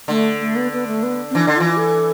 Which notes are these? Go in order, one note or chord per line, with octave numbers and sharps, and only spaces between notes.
D3 A3
A3
B3
B3
A3
B3
C4
E3 D4
D3
E3 F4
A4